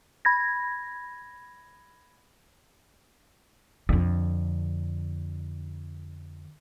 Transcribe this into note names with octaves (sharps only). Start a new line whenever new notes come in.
B5 G#6 A#6
F2 D3